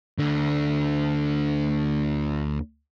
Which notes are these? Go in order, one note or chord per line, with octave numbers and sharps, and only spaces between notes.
D2 D3